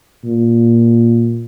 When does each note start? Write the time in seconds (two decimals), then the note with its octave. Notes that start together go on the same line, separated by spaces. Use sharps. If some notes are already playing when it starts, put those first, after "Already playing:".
0.24 A#2